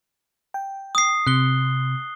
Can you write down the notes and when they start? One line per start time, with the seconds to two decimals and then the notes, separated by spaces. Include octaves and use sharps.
0.54 G5
0.95 D#6 C7
1.27 C3 F#6 G7